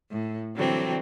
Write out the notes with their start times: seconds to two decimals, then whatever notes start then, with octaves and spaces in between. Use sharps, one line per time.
0.10 A2
0.55 D3 E3 F#3 G3 C4